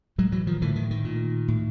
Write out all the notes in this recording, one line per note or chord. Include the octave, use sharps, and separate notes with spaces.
A2 F#3 G#3
E3 F#3
D#3 F3
A2 D3 E3
D#3
D#3
A#2
A2